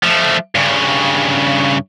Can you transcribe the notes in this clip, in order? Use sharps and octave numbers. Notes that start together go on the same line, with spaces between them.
F3 A3
G2 C#3